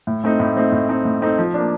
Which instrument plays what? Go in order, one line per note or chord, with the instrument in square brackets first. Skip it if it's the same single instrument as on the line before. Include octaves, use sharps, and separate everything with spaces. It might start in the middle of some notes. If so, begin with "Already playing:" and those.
[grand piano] A2
A3 C4 D#4
A2
A3 C4 D#4
A2
A3 C4 D#4
A2
A3 C4 D#4
F3
A#3 D4